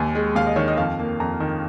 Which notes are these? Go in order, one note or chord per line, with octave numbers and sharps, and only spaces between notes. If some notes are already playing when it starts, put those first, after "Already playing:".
Already playing: D#2 G#5
G#3
D#2 F5
D#5
D#3 C#5
D#5
F2 F5
A#3
F2 A#5
D#3